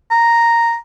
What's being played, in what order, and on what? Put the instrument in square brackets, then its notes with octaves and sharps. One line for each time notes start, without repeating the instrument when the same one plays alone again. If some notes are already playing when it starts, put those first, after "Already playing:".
[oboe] A#5